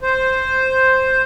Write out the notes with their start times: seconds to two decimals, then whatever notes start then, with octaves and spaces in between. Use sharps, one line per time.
0.02 C5